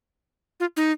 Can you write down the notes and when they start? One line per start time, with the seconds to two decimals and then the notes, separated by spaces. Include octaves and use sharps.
0.60 F4
0.77 D#4